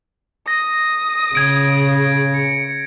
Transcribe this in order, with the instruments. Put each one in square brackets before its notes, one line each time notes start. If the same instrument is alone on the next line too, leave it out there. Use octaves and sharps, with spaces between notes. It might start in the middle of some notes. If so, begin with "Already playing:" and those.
[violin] D#6 [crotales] A#6
[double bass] C#3 [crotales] G#6 D7
[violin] C#7